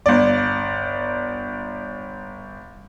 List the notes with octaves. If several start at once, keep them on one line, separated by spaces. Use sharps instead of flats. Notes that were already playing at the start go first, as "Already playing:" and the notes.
G1 D5